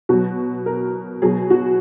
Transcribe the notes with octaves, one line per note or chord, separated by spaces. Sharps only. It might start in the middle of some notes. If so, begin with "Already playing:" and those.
B2 F#3 F#4
A#4
B2 F#3 G#4
F#4